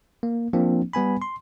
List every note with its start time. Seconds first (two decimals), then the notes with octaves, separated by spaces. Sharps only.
0.23 A#3
0.53 F3 A#3 C4 D4
0.93 G3 B3 G#5 B5
1.22 C6